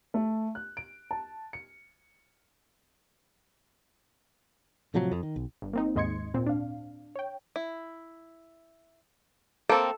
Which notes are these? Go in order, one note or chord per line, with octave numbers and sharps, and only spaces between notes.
A3
F#6
D7
A5
C#7
A2 C3 F3 F#3
F2
D#3
B1
G1
A#3 C4 D#4
D#2 G#2 D#5 C6 G#6 C#7
A#2 C4
D4 F5
C#5 G5
E4
A#3 C4 A4